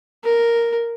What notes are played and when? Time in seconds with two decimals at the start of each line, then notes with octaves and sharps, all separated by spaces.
0.24 A#4